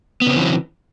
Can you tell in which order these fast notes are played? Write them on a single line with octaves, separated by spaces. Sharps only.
B3 C#3 C4 E3 F#3